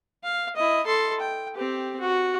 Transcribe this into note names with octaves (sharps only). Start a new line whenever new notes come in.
F5
E4 D#5
A4 C6
G5
C4 G4
F#4